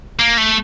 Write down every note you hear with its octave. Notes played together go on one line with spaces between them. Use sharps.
A#3
A3